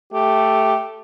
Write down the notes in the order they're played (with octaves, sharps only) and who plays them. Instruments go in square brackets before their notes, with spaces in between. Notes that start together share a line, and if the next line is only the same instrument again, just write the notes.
[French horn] A3 [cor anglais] G4